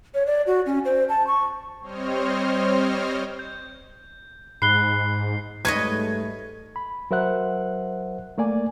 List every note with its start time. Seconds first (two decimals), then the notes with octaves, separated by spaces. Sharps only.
0.14 C#5
0.26 D5
0.47 F#4
0.66 C#4
0.85 C5
1.09 A5
1.27 C#6
1.80 G3 C4 C5 C#5 D#5 F6
3.39 G6
4.62 G#2 B5 F#6 C7 G7
5.65 G#2 G3 A3 B4 C#5 D#5 G#6
6.76 B5
7.11 F#3 A#4 C5 E5 F#5 F#6
8.38 A3 A#3 D5 G#5